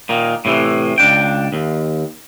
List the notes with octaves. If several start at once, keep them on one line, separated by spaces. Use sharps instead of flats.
A#2 D#3
A2 C3 D#3 E3
C#2 D4 G5
D#2